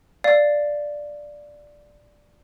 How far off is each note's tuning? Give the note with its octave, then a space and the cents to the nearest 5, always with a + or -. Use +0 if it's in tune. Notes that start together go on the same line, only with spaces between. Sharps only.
D5 +0 F5 +0